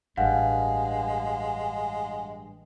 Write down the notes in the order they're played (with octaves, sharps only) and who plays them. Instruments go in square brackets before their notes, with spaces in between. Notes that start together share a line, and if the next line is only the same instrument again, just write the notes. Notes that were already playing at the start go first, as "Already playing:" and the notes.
[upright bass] A1 [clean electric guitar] G2 [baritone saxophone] G#3 [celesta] F5 F#5